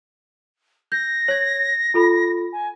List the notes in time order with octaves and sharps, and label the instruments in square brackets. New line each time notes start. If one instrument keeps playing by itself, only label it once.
[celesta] G6 [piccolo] A#6
[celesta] C#5 G#6
F4 A4 B5
[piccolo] G#5